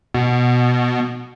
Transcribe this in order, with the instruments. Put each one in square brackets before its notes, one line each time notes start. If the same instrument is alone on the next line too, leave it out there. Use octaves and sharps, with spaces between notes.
[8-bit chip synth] B2